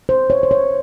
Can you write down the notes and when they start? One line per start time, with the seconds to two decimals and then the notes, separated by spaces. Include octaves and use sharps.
0.09 C5
0.30 C#5
0.43 C5
0.51 C#5